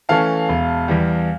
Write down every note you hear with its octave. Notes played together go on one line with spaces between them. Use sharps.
E3 A3 C#4 F5 A5
E1
E2 E3 G3